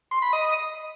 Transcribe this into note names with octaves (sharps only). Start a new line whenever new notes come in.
C6
B5
D#5